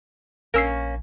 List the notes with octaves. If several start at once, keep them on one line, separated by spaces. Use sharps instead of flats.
A#1 A#3 C#4 A#4 E6 C7